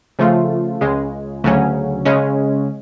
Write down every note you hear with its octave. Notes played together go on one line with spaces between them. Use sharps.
C#3 F3 A3 F4
C#2 C#3 G#3
D2 C#3 F#3 C#4
C#3 G#3 C#4